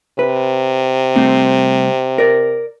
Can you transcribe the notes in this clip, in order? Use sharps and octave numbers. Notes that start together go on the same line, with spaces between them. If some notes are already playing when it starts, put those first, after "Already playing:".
C3 B4
C2 A3 C4
A#4 D5